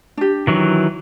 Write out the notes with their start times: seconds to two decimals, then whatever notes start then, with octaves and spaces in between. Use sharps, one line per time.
0.17 D4 G4
0.47 D#3 E3 F#3